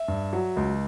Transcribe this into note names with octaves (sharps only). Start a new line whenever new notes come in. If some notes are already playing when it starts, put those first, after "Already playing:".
Already playing: E5
G2
F#3
C#2